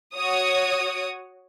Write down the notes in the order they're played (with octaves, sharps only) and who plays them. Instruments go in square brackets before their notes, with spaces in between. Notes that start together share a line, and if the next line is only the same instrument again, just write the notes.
[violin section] F#4 C#5 D#6